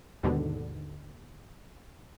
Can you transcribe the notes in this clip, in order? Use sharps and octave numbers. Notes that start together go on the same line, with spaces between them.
D#2 G#2 B2 D3